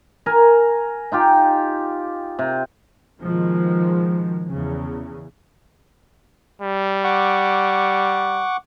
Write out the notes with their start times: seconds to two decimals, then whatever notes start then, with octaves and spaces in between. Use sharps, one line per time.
0.26 A#4 G#5
1.12 D#4 F4 G4
2.39 C3
3.23 B2 D#3 F3 G#3
4.49 E2 C#3
6.62 G3
7.04 F#5 C#6 D6